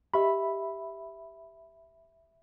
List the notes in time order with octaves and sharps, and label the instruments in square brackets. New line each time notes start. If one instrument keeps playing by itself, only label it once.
[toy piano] G4 D#5 [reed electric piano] E5 B5